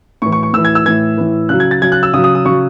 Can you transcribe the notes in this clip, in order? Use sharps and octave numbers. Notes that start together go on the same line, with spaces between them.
A2 E3 C#6
C#6
C#6
A2 E3 E6
G#6
E6
A2 E3 G#6
A2 E3
C#3 F#3 F#6
G#6
A6
C#3 F#3 G#6
F#6
E6
C#3 F#3 D#6
D#6
D#6
C#3 F#3 C#6